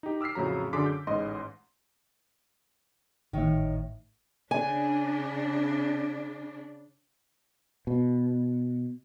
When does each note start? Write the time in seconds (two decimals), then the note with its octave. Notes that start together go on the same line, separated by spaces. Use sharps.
0.03 D#4 G4
0.21 D6 E6 F6 B6 C7
0.35 F2 A2 C#3 F#3 A#5
0.73 F#2 D3 G#4 C6 D6 B6
0.86 D6 G6
1.07 A1 G#2 D#5 C6
3.33 G#1 A2 D#3 C#5
4.51 C#3 D4 G#5
7.87 B2